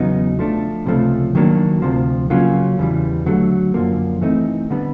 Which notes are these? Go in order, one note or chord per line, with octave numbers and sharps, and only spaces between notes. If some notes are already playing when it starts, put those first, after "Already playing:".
Already playing: E2 C#3 F#3 B3 D#4
F3 A3 D4
C#2 C3 F3 A3
D#3 F#3 A#3 D4
D2 C3 F3
C#3 F#3 A#3 C#4 F4
E2 C#3 E3 G3
D3 F#3 A3
F#2 D3 F3 A#3
E3 A3 C4 D#4
D3 G3 B3